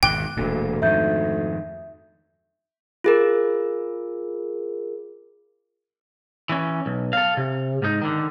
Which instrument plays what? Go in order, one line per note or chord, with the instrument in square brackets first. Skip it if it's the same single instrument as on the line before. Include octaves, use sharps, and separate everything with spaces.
[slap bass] G#1 E2 B2 [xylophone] G5 [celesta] D6 F#6 G7
[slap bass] E1 A#2 [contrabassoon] D2
[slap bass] F2 G#2 D#3 [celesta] E5 G6
[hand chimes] F4 G#4 A#4
[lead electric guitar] E3 C#4
B1
A4 F5
C3
G#2 D#4
D3 D#3